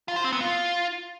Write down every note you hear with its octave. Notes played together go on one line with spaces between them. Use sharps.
F4
C5
C4
B3
F4